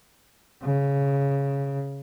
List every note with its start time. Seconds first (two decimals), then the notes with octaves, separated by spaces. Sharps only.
0.63 C#3